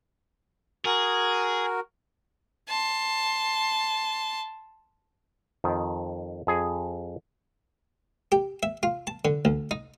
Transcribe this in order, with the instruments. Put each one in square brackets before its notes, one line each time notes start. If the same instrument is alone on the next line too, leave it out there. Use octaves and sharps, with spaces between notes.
[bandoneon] F#4 A#4 [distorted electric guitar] G#4
[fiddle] A5 C6
[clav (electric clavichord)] F2 D#3
F2 G#4
[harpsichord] G4
E5
F4
A5
D3
D2
D#4